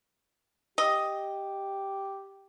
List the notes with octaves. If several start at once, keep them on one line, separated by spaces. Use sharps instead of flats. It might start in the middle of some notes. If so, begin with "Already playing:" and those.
G4 D#5